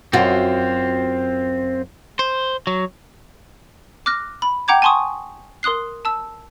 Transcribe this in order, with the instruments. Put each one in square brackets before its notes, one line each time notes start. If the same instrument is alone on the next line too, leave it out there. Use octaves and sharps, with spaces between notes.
[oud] F#2 F#4 [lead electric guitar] C4 F4
[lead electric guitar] C5
F#3
[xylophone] D6 F6 F#6 A#6
B5
F#5 G5 A#5 D6 G6 G#6
G#5 A5 C6 C#6 D#6
A#4 C6 D#6 F#6 C7
A5 E6